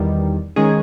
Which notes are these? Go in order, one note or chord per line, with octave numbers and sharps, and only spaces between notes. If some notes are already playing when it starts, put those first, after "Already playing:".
Already playing: E2 D#3 G3
D#3 G#3 C#4 G#4